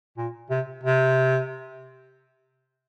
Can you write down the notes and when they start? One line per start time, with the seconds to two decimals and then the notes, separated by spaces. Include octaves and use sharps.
0.18 A#2
0.51 C3
0.84 C3